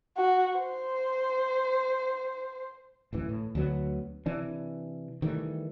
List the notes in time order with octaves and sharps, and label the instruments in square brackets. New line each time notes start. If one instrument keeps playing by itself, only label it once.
[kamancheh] F#4
C5
[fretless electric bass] D1 A1 E3
A2
D2 D3 F#3 B3
C3 E3 D4
D#3 E3 G3 A3